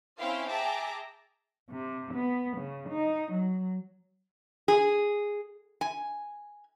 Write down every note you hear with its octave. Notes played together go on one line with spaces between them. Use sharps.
C4 C#4 E4 C5 F5 G5
G#4 E5 G5 A5 A#5 D6
C3
B3
C#3
D#4
F#3
G#4
G#5